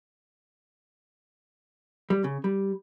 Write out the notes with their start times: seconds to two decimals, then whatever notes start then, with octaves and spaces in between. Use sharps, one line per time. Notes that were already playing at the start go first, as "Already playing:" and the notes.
2.10 G3
2.24 C#3
2.44 G3